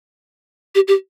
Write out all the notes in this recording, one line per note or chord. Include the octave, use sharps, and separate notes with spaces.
G4
G4